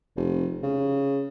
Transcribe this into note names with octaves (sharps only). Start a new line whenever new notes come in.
F1
C#3